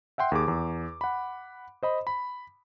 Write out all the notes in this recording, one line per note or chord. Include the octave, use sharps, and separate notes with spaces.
E5 F#5 G5 C6
D#2 G#4 D6
E2
F#5 B5
C5 D#5 B5
B5